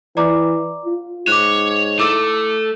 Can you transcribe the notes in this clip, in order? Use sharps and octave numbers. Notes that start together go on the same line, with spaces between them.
E3 D5 A#5 D6
F4
G#2 C#5 D6 F#6
A3 E4 D6 E6